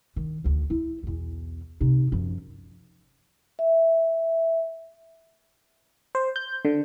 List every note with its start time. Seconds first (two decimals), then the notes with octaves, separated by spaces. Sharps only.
0.16 D#3
0.44 D2 D#3
0.70 E4
1.03 B1 E2
1.80 C3 D#4
2.12 F#2 F3
3.59 E5
6.15 C5
6.36 G6
6.65 D3